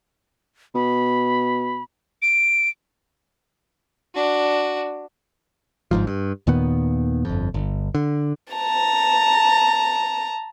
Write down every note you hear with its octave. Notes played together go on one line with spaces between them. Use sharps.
B2 B5
D7
D4 F#4
G1 G#2 F3
G2
D#2 A#2 D#3 B3
G1 F2
G1
D3
A5 A#5